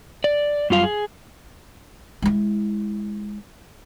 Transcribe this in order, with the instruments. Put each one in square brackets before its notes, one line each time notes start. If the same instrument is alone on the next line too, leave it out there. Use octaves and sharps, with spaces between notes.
[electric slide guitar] D5
F#2 G3 F4 F5
G#4
[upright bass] G#3 E4